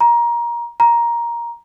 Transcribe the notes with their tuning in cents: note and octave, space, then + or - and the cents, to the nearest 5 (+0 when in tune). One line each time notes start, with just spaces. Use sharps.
A#5 +20
A#5 +10